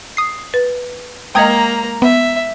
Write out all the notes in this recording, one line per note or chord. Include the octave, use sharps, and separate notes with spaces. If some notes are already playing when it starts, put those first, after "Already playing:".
D#6 C7
B4
G#3 A#3 D#5 G5 A#5 D#6 G#6
B3 E5